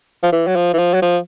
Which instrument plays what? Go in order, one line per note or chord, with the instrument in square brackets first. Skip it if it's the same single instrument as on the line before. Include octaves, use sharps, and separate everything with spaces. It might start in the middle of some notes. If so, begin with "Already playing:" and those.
[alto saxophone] F3
E3
F#3
F3
E3
F3
F#3
F3